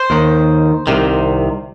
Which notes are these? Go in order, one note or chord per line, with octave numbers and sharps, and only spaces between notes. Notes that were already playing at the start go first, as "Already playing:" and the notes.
Already playing: C5
D#2 D#3
C2 C3 D#3